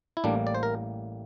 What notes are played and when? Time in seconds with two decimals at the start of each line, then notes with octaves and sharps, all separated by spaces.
0.17 E4
0.24 A1 A2 G3 A#3 D4
0.47 D5
0.55 C5
0.63 A#4